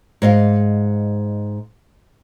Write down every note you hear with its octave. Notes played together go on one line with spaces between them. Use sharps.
G#2 D#5 F5